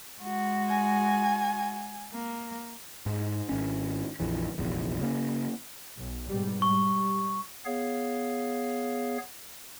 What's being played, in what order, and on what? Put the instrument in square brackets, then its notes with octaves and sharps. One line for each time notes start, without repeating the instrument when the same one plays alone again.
[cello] G#3 F#4
[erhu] G#5
[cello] A#3
[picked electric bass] G#2
G#1 C#4
A#1 F2 E3
F1 A#1 E2
C#3 A#3 B3 C#4
[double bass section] B1
G#2 B2 G3
[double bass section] G3 [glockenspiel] C#6
[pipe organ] B3 G#4 C#5 F5